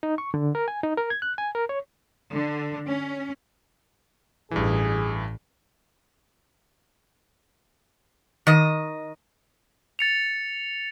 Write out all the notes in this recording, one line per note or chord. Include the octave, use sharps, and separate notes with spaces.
D#4
C#6
D3
A#4
G#5
D#4
A#4
G#6
F#6
G#5
A#4
C#5
D3
C#4
A1 G2 E3 G#4
D#3 D#5
A6 C#7 F7